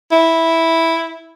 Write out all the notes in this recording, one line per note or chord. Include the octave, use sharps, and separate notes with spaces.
E4